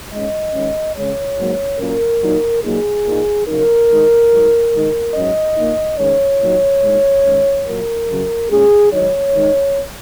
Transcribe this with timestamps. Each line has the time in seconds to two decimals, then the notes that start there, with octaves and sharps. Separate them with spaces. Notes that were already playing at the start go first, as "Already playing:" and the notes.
0.11 G#2 G#3 C#4 D#5
0.53 D#3 G#3 C#4
0.96 C#3 G#3 C#4 C#5
1.38 G#2 F#3 A#3
1.79 A#2 F#3 C#4 A#4
2.22 A#2 F#3 D#4
2.63 A#2 F#3 A#3 D#4 G#4
3.06 A#2 A#3 D#4
3.47 C#3 F#3 D#4 A#4
3.88 D#3 G#3 D#4
4.31 G#2 F#3 D#4
4.73 D#3 G#3 D#4
5.14 G#2 F#3 C#4 D#5
5.56 A#2 A#3 D#4
5.98 G#2 D#3 G#3 C#4 C#5
6.40 A#2 F#3 D#4
6.82 A#2 G#3 D#4
7.25 D#3 G#3 C#4
7.66 A#2 F#3 A#3 A#4
8.09 F#2 C#3 F#3
8.49 A#2 G#3 C#4 G#4
8.92 G#2 D#3 F#3 D#4 C#5
9.34 D#3 G#3 D#4